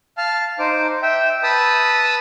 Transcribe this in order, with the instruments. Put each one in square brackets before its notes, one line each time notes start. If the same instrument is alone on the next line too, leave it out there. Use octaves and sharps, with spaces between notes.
[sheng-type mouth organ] F5 A5 F6
D#4 C5 D6
E5 G5
B4 A5 B5 D#6 E6